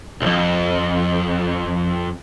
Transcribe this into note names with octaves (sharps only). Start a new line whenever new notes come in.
C2 F2